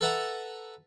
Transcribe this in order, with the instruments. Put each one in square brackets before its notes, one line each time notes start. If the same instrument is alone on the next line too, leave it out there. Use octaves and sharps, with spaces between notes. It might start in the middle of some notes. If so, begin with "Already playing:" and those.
[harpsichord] A4 B4 E5 F#5 A5 A#5